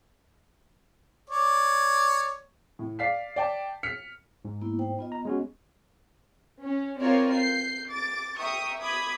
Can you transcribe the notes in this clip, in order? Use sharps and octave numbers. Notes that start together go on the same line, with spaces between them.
C#5 D5
A2
D5 F5 B6 C7
D5 G5 A5
F6 B6 C#7
G#2
A#3 B3 E4
D#4 C5 G5
B3 F4 D#5
B3 A#5
G#3 C#4 F#4
C#4
C4 F4 A#4 C#5 D5
G6 C7
D6 A6
E5 G5 A#5 C#6 D#6
B5 D6 D#6 G#6